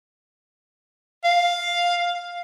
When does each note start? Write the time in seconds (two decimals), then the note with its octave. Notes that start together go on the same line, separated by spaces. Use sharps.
1.24 F5